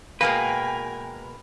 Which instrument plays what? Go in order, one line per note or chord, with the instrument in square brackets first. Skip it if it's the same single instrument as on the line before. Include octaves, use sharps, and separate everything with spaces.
[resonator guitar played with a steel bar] B2 G#3 A#3 [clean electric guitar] A#4 B4 [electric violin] G5 G#5